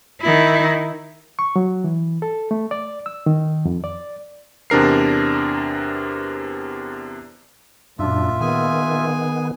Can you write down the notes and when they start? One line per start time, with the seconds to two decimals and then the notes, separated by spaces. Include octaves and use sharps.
0.21 D#3 E4
1.39 C#6
1.56 F#3
1.84 E3
2.22 A4
2.51 A3
2.71 D5
3.06 E6
3.26 D#3
3.65 F2
3.84 D5
4.70 E2 C3 D4 A#4 C7
7.99 F#2 A#2 D4 F4 E5
8.41 D#3 B3 G#4 G#5